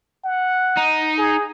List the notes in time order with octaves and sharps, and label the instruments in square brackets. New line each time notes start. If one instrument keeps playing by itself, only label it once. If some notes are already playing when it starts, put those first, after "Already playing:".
[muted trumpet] F#5
[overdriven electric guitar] D#4
[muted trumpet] G#4